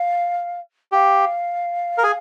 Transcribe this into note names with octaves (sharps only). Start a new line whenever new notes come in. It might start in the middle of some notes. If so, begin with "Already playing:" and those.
Already playing: F5
G4 F5
A#4
G#4